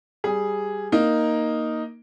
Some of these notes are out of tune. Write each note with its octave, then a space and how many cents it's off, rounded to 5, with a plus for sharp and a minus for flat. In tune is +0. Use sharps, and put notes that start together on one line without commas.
G3 +0 G#4 +0
A#3 +0 D#4 +0